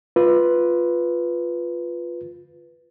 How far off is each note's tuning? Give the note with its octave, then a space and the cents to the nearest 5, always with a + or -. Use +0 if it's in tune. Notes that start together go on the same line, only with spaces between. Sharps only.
F4 +0 B4 +0